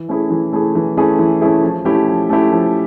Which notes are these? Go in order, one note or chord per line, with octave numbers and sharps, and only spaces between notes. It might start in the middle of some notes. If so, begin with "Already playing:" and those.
Already playing: E3
A3 C#4 E4 G#4
E3
A3 C#4 E4 G#4
E3
A3 C#4 E4 G#4
E3
A3 C#4 E4 G#4
F3
A3 C#4 E4 G4
F3
A3 C#4 E4 G4
F3